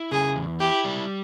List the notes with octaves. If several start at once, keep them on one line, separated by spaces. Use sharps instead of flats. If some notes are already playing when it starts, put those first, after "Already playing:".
Already playing: E4
C#3 G#4
E2
E4 G4
G3